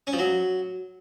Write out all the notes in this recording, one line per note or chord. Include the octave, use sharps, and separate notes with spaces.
C#4
F3
F#3